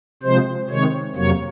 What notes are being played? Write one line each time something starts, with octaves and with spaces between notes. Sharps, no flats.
C3 F3 G#3 C5
C3 D#3 G#3 C#5
F2 C3 F#3 A#3 C#5